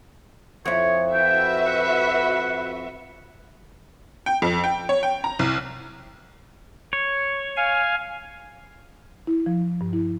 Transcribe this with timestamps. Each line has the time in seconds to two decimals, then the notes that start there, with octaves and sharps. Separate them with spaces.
0.66 F2 E4 C#5
1.14 F#4 B4 E5 G5
1.66 F#5
4.26 G5
4.42 F2
4.64 G5
4.89 C#5
5.03 G5
5.24 A#5
5.39 C2
6.93 C#5
7.57 F5 G#5
9.27 E4
9.46 F3
9.81 G2
9.93 E4